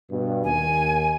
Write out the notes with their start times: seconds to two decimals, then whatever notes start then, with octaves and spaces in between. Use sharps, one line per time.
0.10 G2 B2
0.44 D#2 G#5